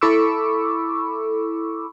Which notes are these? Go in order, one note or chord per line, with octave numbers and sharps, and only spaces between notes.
E4 A4 B5 C#6 D6 E6